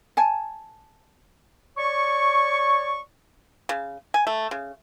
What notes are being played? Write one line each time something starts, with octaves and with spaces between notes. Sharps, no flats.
G#5 A5
C#5 D5 C#6
C#3
G#5
A3
C#3